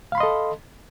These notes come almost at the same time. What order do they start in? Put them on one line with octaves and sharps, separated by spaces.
F5 B5 C6 D#5 A4